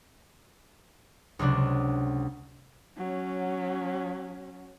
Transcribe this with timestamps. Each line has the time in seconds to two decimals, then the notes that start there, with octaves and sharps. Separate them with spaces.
1.39 C#2 C3 F#3 D4 F#6
2.97 F#3 C#4